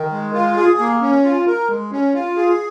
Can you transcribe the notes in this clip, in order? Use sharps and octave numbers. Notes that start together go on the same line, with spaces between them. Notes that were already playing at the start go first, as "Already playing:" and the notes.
Already playing: D#3
G#3
F4
G#4
A#3
C#4
F4
A#4
G#3
C#4
F4
G#4